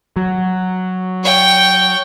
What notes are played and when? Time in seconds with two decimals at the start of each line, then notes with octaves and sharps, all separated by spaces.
0.16 F#3
1.23 C#5 G5